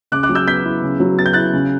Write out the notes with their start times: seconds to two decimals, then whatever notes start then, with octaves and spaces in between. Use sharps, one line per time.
0.12 C#3 D6 F#6
0.23 D6 F#6
0.29 F#3
0.35 E6 G6
0.47 B3 G6 B6
0.65 E4
0.83 C#3
1.00 F#3
1.18 B3 A6
1.26 G6
1.33 E4 F#6 A6
1.53 C#3